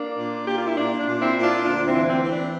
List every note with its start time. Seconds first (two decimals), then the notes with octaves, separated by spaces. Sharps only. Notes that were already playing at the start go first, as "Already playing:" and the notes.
Already playing: A#3 D4
0.18 A#2
0.46 A#3 G4
0.57 F4
0.67 E4
0.76 A#2 D4
0.99 D4
1.06 A#2
1.21 C4 E4
1.35 A#2
1.42 D4 F4
1.65 D2 D4 F4
1.87 C4 E4
1.94 E3
2.09 C4
2.24 E3
2.31 D4